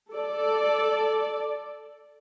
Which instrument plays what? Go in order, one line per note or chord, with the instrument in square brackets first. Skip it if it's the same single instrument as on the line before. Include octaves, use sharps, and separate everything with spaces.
[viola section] A4 D5